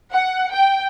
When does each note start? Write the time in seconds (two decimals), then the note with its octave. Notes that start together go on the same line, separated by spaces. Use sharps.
0.11 F#5
0.53 G5